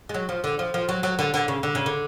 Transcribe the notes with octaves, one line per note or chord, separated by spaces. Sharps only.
G#3
F#3
F3
D3
F3
F3
F#3
F#3
D3
D3
C#3
D3
C#3
D3